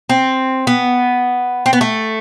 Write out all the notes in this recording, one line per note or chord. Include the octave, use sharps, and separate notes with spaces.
C4
B3
C4
B3
A3